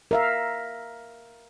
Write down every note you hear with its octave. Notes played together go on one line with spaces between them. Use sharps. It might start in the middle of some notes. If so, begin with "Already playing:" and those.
A#4 E5 F5